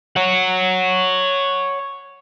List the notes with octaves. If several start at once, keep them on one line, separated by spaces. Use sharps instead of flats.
C#5 F#5